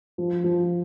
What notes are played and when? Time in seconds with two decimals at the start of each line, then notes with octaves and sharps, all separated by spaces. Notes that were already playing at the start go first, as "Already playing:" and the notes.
0.18 F3
0.44 F3